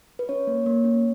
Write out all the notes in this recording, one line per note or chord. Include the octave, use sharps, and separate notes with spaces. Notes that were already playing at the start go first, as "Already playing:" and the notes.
B4
C#4 C#5
A#3
A#3
C#4